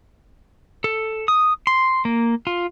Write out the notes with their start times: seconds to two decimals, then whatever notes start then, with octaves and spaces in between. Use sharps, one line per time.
0.84 A4
1.28 D#6
1.67 C6
2.05 A#3
2.47 F4